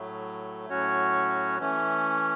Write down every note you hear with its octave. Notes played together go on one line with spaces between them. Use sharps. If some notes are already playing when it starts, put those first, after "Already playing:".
Already playing: A2 F#3 A3
A2 F#3 C#4 F#4 C#5
E3 A3 C#4